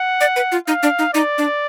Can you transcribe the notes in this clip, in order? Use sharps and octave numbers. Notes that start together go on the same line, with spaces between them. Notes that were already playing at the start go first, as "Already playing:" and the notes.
Already playing: F#5
D5
B4
F4
D#4 F5
D4
D#4
D#4 D5
D4